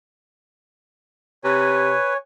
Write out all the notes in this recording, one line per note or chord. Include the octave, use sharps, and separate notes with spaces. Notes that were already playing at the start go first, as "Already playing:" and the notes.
C3 B4 C#5 G#5